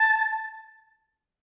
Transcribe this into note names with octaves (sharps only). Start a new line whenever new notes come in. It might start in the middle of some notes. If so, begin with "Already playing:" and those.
Already playing: A5